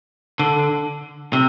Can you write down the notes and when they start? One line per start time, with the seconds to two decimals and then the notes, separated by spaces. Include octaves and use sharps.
0.39 D3
1.33 C3